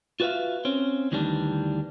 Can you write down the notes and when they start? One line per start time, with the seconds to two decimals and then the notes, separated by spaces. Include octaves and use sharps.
0.20 F4 F#4 B4 C#5 E5 F5
0.65 C4 C#4
1.12 D2 D#3 E3 G3 B3 D4